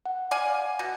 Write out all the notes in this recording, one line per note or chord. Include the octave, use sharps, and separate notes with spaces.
F#5
D5 F5 G#5
B2